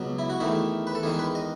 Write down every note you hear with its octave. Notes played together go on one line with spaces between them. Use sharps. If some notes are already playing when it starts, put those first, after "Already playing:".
Already playing: C#2 B2 F#3 B3
E4
F#4
E2 D#3 A3 E4
B4
A4
E2 D#3 G#3 G#4
B4
D#5